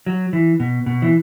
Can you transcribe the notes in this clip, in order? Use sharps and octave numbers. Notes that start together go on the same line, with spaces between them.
F#3
E3
B2
B2
E3